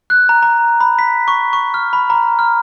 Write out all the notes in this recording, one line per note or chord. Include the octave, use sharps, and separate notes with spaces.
F#6
A#5
A#5
B5
B6
C#6
C#6
F6
B5
A#5
F6